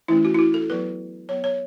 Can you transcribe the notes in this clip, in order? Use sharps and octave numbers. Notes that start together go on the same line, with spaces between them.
E3 A3 C#4 E4
F#4
E4
F#4
A4
F#3 B3 B4
F#3 B3 C#5
C#5